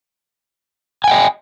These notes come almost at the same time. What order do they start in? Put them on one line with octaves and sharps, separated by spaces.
G#5 G5 D#5